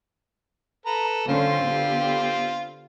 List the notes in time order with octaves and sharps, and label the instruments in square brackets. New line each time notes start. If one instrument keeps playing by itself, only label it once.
[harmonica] A4 B4 A#5
[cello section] D3 C#4 C5 [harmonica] C4 F4
[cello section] D3 B3 G4